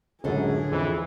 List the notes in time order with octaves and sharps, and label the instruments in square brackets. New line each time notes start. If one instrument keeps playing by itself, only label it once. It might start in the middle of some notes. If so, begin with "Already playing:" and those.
[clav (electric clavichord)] C#2 F#2 [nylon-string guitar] A2 D3 A4 [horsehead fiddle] G#4
[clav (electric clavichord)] F2 [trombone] E3